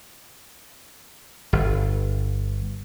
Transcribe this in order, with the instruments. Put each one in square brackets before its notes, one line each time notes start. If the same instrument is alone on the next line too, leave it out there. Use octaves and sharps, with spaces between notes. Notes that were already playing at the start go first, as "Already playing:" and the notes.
[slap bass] G1